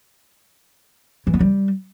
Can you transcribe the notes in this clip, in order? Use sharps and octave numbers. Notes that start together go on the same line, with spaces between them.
E3
B3
G3